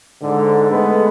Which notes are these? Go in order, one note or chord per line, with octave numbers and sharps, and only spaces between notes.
G#2 D3
G#3 A3 B3 A4